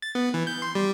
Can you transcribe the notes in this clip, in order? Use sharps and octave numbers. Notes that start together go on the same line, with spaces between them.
A6
B3
E3
G6
C6
G3